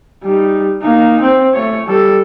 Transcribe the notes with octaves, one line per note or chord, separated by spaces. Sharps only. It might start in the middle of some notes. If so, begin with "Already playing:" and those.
G3 D#4
A#3 D#4
C4
A3 C#5
G3 A4